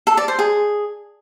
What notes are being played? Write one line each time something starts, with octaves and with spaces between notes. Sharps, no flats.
A4
D5
C5
G#4